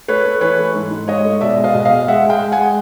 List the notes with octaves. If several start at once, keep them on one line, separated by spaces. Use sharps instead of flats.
A3 B4 C#5
A3
E3 B4 C#5
A3
G#2
G#2
G#2 C#5 D#5
A3
B2 D5 E5
G#3
D#5 F5
B2
D#5 F5
G#3
G#3 E5 F#5
G#3 F5 G5
G#3
F#5 G#5
G#3